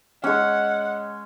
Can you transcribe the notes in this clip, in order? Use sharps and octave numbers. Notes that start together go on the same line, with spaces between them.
G#3 C#4 F#5